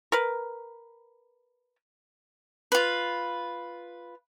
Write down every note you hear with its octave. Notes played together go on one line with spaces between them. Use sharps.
A#4 B4
F4 B4